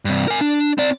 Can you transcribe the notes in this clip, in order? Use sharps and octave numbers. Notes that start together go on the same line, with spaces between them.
G2 C3
A#4 G#5
D4
C4 D5